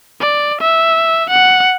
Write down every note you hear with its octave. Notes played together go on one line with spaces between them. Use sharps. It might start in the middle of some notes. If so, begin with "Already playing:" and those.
D5
E5
F#5